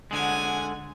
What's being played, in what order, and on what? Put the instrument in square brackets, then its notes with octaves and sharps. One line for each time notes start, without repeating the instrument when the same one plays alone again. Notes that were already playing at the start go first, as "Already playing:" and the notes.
[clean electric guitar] D3 G#3 [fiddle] F#5 G#5